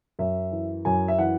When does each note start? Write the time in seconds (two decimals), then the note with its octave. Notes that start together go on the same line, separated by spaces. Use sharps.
0.19 F#2 E5
0.52 E3
0.85 F#2 G#5
1.08 E5
1.18 E3 F#5